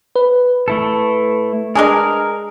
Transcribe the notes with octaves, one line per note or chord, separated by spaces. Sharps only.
B4
A3 E4 A4
G#3 D4 G#4 A#4